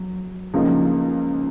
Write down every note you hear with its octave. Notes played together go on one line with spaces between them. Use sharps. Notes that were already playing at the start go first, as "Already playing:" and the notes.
Already playing: F#3
C#2 C#3 F3 A#3 D#4